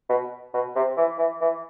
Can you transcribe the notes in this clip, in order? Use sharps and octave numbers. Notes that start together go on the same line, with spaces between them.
B2
B2
C3
E3
E3
E3